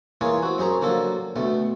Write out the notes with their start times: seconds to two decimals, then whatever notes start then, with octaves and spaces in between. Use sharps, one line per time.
0.21 E3 A#3 F4 G#4 C#5
0.43 C4 F#4
0.58 F#2 G#4 C5 A#5
0.82 D3 F3 F#3 A#3 A4
1.36 D2 B2 A3